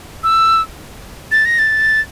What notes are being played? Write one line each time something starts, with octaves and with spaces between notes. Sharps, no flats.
E6
A6
A#6
A6